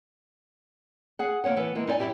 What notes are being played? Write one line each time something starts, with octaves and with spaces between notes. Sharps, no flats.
G#4 F#5
D3 A#3 C#4 C#5 F#5
E3 B3 A4
E3 G#3 A#3
D#4 E4 D5 G#5
F#2 E3 E4 G4 E5